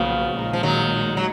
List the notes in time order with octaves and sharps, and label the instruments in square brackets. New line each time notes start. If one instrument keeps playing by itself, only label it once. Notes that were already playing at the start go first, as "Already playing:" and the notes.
Already playing: [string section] B1 A#2 F#3 B3 [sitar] C#3 F3
[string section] A#1 A#2 G#3 D#4
[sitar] F3
D#3 F#3
F#3